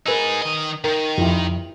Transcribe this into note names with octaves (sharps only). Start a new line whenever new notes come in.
D#4 G#4 A#4 B4 E6
D#3 D#5
D#3 A#4 A#5
F2 E4 F4 G4